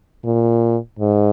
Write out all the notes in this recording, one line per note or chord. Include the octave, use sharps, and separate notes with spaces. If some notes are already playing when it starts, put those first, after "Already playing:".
A#2
G#2